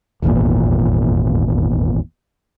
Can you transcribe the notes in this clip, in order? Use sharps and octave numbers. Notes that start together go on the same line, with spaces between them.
D#1 G#1 E2 A#2